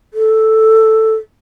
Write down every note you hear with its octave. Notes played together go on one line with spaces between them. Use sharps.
A4